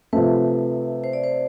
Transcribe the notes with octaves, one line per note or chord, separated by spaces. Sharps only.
C3 F3 A3 B4
C5
D5
C5